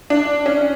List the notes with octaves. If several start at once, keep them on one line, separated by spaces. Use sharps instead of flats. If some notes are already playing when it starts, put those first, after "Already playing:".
D4
C#4